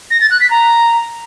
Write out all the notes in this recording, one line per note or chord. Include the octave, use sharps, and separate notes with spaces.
A#6
A6
F#6
B6
A#5